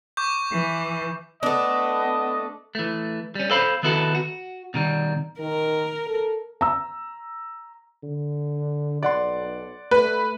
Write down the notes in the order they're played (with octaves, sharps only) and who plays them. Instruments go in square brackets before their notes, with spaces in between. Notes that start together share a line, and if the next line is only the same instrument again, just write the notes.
[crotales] C#6 D6 G6
[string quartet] E3
[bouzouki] A3 D4 [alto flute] B3 [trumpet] D#5
[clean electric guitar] E3 A3
G3 C#4
A4 C5 F5 B5
D#3 B3 E4 F#4 A4
F#4
B2 D#3 G3
[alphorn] D#3 [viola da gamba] A#4
[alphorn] A4
[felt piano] A#5 E6
[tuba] D3
[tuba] B1 [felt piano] D5 F#5 C6
[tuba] A3 [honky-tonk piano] B4